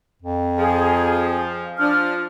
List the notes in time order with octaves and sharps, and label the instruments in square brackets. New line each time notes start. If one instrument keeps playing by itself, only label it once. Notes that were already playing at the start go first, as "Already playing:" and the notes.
[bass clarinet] F2
[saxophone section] F3 [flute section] G#4
[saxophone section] F3 [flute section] D4 F6